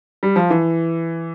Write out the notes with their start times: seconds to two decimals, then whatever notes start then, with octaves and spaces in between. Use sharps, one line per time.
0.23 G3
0.36 F3
0.50 E3